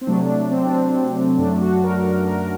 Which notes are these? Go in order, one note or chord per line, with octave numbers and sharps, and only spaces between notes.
C4
C3 F#3 A3 D4
D4
C4
D4
C4
F#2 F#3 A3 D4
F#4
A#4
A#4
A#4